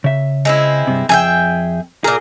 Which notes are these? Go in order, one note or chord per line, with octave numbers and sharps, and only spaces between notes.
C#3 E5
G#3 C4 E4
G2 C3
F2 G#4 E5 G5 G#5
A#2 G#4 A#4